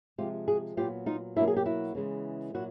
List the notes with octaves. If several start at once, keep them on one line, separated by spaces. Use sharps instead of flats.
C3 F3 G#3 F4 G4
F#4 G#4
A#2 F#3 B3 F4 G4
D#4 F4
B2 F#3 A#3 D4 E4
G#4
G4
E4 F#4
C#3 E3 G#3 B3
A#2 F#3 E4 F#4